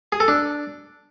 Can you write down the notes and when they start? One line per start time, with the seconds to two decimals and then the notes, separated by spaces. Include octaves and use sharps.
0.12 G#4
0.20 A4
0.28 D4